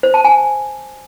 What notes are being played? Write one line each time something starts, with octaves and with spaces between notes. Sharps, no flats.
C5
A5
G#5